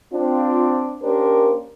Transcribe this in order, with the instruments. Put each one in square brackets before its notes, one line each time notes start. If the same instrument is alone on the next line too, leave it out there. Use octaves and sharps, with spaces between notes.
[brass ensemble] C4 D4 F4
A#3 C#4 D4 G4 A#4 C5